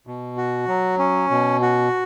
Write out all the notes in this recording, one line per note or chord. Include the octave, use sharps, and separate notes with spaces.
B2
F#4
F#3
C#4
B2
F#4